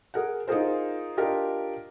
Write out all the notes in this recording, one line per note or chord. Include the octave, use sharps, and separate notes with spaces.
G#4 A#4 F#5
D#4 F4 G#4 A#4 C5
D4 F4 G4 A#4 D#5